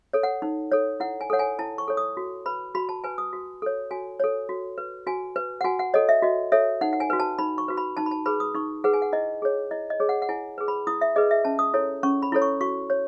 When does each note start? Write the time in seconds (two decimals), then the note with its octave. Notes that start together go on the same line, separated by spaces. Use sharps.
0.13 A4 C#5
0.23 F#5
0.42 D#4
0.72 A4 C#5
1.00 E4 F#5
1.21 G#5
1.30 A4 C#5 F#5
1.39 G#5
1.59 E4 A5
1.78 C#6
1.88 A4 C#5
1.97 D#6
2.17 F#4
2.46 B4 B5
2.75 F#4 B5
2.89 A5
3.04 B4 G#5
3.18 D#6
3.33 F#4
3.62 A4 C#5
3.91 F#4 G#5
4.20 A4 C#5
4.49 F#4
4.78 B4
5.07 F#4 G#5
5.36 B4
5.61 F#5
5.64 F#4 G#5
5.79 F#5
5.94 A4 C#5 D#5
6.09 E5
6.22 F#4 D#5
6.52 A4 C#5 E5
6.81 D#4 F#5
6.93 F#5
7.00 G#5
7.10 F#4 B4
7.20 A5
7.39 D#4 B5
7.58 C#6
7.68 F#4 B4
7.77 B5
7.97 D#4 A5
8.06 B5
8.11 A5
8.26 G#4 B4 B5
8.40 D#6
8.55 D#4 C#6
8.84 G#4 B4 F#5
8.93 G#5
9.02 F#5
9.13 E4 D#5
9.42 G#4 C#5
9.71 E4 D#5
9.90 D#5
10.00 G#4 C#5
10.09 F#5
10.22 F#5
10.29 E4 G#5
10.58 G#4 B4
10.68 B5
10.87 E4 D#6
11.01 E5
11.16 G#4 B4 D#5
11.31 E5
11.45 C#4 A5
11.59 D#6
11.74 E4 A4 C#5
12.03 C#4 C#6
12.22 B5
12.32 E4 A4 C#5
12.42 C#6
12.61 F#4 C#6
12.90 C#5